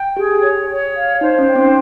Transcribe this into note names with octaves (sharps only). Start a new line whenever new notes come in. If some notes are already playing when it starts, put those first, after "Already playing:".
Already playing: G5
G4 G#4
C#5
C#5
F5
D#4 C5
C#4
G5
C4